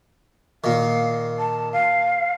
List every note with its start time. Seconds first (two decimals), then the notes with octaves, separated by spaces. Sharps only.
0.64 A#2 D#3 F5
1.39 A5
1.73 F5